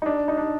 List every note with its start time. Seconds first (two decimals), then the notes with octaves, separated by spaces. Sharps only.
0.02 D#4
0.06 D4
0.28 D#4
0.37 D4